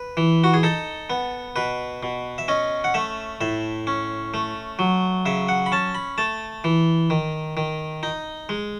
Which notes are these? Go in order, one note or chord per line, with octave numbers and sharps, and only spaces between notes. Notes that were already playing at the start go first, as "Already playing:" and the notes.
Already playing: B4
E3
F#4
G#4
D#4 A4
B3
B2 B4
B2
E5
C#4 D#5
F#5
A3 E5
A2 E5
C#4
A3
F#3
C#3 E5
F#5
B5
C#4 A5
B5
A3 A5
E3
D#3
D#3
D#4
G#3